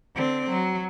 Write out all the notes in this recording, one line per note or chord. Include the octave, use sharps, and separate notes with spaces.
D3 C4
F#3